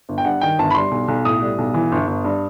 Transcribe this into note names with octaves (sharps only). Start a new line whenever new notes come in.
G1
G5
G2 F#5
D#3 G5
G1 A5
B5
G3 C6
B1
B1
A2 D#6
G3
B1
E3
G1
G1
G2